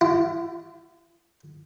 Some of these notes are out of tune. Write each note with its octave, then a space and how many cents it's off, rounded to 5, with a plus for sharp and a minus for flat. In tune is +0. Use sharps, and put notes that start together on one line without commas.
E4 +40